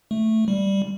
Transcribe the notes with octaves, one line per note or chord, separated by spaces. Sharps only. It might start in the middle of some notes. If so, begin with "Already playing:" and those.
A3
G3